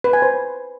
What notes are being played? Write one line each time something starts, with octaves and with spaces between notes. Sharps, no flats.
B4
G#5
C5